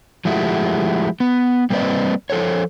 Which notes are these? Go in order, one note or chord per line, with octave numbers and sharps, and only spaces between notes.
F3 G#3 A3 E4 F#4 G4
B3
G3 A#3 C4 B4 D5 D#5
F3 A4 C5 C#5